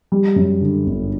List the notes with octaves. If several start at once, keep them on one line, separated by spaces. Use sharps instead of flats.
G3
F#2
D3
G1